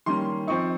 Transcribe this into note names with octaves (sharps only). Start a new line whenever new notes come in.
D#3 G3 A#3 C#4 C6
F3 C4 D#4 C#6